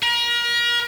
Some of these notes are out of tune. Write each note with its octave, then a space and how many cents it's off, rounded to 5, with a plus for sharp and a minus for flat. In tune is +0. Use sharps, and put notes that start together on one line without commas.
A#4 +35